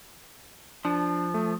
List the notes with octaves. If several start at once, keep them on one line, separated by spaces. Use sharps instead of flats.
F3 D4
A3